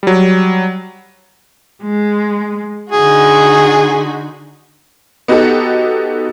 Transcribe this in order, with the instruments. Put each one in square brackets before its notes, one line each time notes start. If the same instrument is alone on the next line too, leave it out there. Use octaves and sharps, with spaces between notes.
[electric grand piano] F#3 G3
[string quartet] G#3
[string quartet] D3 D#4 F#4 [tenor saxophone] G#4
[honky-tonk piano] B3 D#4 F#4 G4 A4